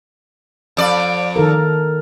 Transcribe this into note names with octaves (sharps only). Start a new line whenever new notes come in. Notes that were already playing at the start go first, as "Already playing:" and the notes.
F2 D5
D#3 A4 A#4